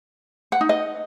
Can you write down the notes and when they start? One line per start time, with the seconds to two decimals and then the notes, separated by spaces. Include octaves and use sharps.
0.52 F#5
0.61 D#4
0.69 D#5